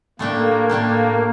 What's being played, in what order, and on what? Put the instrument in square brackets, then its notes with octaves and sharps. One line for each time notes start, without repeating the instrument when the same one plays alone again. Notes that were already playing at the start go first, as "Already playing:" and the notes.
[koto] A2 A3 D4 G4 [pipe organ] A#3
[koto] A2 A3 D4 G4 [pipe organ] A#3